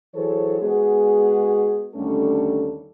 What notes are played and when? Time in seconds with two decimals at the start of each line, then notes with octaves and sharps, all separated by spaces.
0.15 E3 F#3 G#4 A4 C5 C#5
0.61 G#3 B3 F#4 G#4
1.95 D#2 D3 G3 A3 C#4 A4